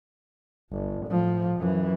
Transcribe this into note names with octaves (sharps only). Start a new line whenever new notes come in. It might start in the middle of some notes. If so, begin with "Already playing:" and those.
G1
A2 F3
F#2 E3